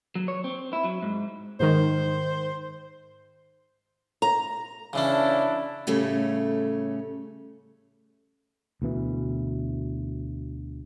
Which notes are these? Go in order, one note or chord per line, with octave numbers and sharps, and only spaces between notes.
F#3
C#5
C4
E4
F#3
G#2
G#2 D#3 C5
A#5
C#3 E3 C#4 D4 E4 A5
A2 C#3 G3 A3 C#4
D2 B2 E3